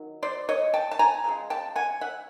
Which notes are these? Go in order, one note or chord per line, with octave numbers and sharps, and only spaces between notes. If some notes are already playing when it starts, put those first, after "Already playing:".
Already playing: D#3 F#3
C5 D5
C#5 D#5
G5 A5
A5
G#5 A#5
C#3 F3 G#3
G5 A5
F#5 G#5
E5 F#5